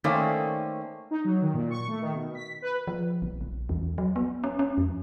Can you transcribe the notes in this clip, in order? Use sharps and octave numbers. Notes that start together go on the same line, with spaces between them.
D#3 A3 A#3 C#4 C5 D5
D#4
F#3
D#3
A#2
C#6
A3
D#3
B2
B6
B4
F3
A#1
A#1
E2
F#3
B3
C#4
C#4
F2